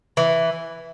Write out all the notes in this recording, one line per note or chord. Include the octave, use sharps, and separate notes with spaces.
E3